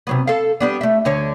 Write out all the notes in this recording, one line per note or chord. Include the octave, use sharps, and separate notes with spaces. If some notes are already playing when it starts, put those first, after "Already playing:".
C3 F#3 B3
A4 F5
G3 B3 D4
A3 E5
D2 D3 C#5